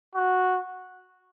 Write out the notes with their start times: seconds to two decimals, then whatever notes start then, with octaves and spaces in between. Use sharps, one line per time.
0.15 F#4